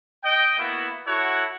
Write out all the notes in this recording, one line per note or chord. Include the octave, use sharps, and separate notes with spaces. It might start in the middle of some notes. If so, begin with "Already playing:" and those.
D#5 G5
A#3 B3 E4 F#4
E4 F#4 A4 C#5 F#5